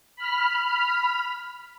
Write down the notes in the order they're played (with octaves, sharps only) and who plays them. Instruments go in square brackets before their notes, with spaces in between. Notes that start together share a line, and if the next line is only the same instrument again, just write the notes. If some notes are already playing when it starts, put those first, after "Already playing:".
[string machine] B5 F6